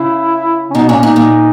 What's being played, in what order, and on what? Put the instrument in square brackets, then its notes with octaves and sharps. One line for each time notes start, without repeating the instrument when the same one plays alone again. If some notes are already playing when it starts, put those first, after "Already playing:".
Already playing: [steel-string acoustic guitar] C#3 [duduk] E4
[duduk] C#4
[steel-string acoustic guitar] B2 [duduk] D#4
[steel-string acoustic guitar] A#2 [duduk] C#4
[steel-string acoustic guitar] A#2 [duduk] D#4
[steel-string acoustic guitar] A#2